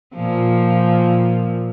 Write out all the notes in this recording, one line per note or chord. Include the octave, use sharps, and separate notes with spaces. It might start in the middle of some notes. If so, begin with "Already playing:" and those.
A#2 F3